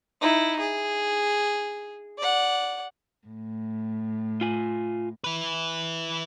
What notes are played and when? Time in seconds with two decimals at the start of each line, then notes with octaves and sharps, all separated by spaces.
0.21 D#4 E4
0.60 G#4
2.18 D5 F#5
3.27 A2
4.41 F4 G#5
5.24 E4 B4